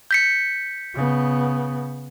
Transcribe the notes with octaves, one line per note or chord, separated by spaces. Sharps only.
G6 B6 C#7
C#3 B3